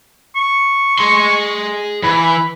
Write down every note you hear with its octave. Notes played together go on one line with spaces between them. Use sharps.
C#6
G#4 C6
E3 B5